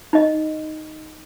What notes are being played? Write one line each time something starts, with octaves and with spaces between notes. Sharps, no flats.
D#4 D#5